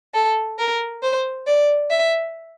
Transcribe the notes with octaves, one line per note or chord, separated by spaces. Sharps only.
A4
A#4
C5
D5
E5